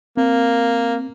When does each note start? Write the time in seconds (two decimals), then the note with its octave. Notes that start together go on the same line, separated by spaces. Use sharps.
0.17 A#3 C4